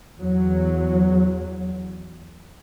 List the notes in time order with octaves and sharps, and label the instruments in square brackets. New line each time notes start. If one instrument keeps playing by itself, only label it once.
[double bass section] E2 F#3